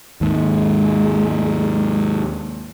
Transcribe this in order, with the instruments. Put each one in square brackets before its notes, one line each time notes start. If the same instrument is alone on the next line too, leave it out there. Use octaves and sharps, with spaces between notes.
[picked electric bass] D#2 G#2 [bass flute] G#3